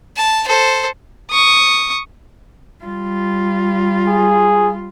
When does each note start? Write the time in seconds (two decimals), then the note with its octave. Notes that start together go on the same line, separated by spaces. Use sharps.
0.16 A5
0.46 A4 C5
1.31 C#6 D#6
2.85 G3 F4
4.08 G#4